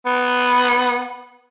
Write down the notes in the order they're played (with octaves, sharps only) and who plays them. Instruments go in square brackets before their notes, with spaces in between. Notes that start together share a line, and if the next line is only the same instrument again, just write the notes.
[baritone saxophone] B3